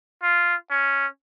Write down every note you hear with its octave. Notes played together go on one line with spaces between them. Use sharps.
F4
C#4